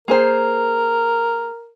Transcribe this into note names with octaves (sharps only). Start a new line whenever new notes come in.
A#3 G#4 A#4 C5